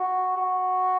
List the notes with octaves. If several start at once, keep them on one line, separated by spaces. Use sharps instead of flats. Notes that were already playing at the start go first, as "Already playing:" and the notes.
Already playing: F#4
F#4